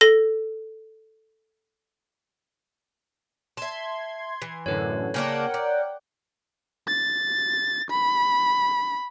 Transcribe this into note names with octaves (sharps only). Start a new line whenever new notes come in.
A4 A#6 G7
E5 A5 C6 G#6
E3
F#2 A2 D3 B4 C#5
C#3 A#3 D4 A#4 C#5 F#5 G5 D7
D5
A6
B5